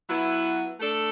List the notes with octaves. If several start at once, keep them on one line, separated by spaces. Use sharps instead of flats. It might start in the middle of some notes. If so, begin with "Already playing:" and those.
F#3 B3 E4
A3 D4 A4